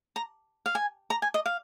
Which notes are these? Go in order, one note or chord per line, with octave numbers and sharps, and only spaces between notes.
A#5
F5
G#5
A#5
G#5
D#5
F5